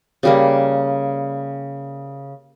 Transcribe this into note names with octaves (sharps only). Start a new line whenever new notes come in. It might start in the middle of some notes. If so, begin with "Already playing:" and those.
C#3 G3 A#3